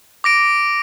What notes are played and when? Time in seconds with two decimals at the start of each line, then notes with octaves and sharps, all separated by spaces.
0.24 D6 A#6 D7